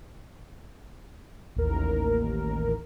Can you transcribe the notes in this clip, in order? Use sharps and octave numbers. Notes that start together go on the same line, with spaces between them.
A1 D#2 A#4